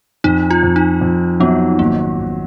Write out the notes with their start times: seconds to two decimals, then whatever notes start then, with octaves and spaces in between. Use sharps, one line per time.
0.24 F2 D#4
0.51 F4
0.63 F2
0.76 D#4
1.01 F2
1.40 F#3 B3
1.79 G#1 A#3
2.19 G#1